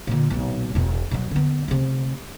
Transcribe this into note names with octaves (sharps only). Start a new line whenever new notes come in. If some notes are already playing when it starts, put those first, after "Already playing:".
A#2 D3
B1 A#2
E1 B2
B2 F#3
D3 B3
C3 A3